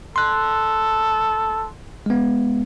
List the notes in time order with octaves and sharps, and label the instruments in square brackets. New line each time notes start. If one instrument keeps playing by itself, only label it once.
[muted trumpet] A4 [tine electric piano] C6 F#6
[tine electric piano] G#3 B3